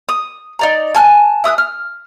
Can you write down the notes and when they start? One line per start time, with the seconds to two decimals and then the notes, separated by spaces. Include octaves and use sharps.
0.09 D#6
0.59 D#4 D5 A#5
0.95 G#5 A5 F6 F#6
1.44 E4 D#6 E6 F#6
1.58 F6